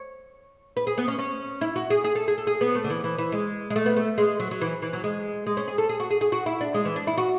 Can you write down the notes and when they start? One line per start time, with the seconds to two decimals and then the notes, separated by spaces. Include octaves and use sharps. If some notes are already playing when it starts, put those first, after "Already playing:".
Already playing: C#5
0.77 B4
0.87 G#4
0.98 B3
1.08 C#4
1.18 C#4
1.61 E4
1.76 F#4
1.90 G#4
2.04 G#4
2.15 A4
2.28 G#4
2.38 A4
2.47 G#4
2.61 B3
2.75 A3
2.84 D3
2.90 E3
3.04 E3
3.18 E3
3.32 G#3
3.70 G#3
3.76 A3
3.86 B3
3.96 A3
4.18 G#3
4.40 F#3
4.51 F#3
4.61 E3
4.82 E3
4.93 F#3
5.04 G#3
5.46 G#3
5.57 C#4
5.68 G#4
5.78 A4
5.89 G#4
6.00 F#4
6.11 G#4
6.21 G#4
6.32 F#4
6.46 E4
6.61 D4
6.74 G#3
6.85 E3
6.96 D4
7.07 E4
7.18 F#4